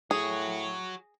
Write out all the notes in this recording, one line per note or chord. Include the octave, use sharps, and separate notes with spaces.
A2 F#4 G#4 C#5